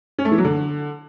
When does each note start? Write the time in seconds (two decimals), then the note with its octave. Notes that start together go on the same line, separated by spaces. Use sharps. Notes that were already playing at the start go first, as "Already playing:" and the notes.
0.18 C#4
0.25 A3
0.31 E3
0.38 F#3
0.44 D3